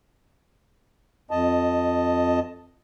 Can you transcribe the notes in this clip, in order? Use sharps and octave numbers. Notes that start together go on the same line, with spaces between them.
F2 D#5 A5